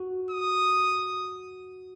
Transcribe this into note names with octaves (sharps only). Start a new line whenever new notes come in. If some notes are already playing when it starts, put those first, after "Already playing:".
Already playing: F#4
D#6